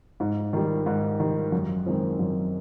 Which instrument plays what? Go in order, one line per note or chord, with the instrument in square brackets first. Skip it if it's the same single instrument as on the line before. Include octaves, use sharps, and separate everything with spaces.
[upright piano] G#2
D#3 G3
G#2
D#3 G3
F#2
D#3 G#3 C4
F#2